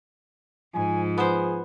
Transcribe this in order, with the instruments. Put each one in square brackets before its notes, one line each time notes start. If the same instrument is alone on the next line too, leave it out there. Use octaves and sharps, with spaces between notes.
[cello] G#2 [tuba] F3 [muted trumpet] G#5
[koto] B3 C5 [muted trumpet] G#4